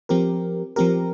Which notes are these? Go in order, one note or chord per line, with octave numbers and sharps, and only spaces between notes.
F3 C4 G4 A#4
F3 C4 G4 A#4